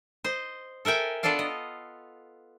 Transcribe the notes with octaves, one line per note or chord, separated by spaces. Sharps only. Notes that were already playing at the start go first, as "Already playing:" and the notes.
C5 D#5
A4 A#4 E5 G5 G#5
B3 D4 F4 A4 D5 F5
D#5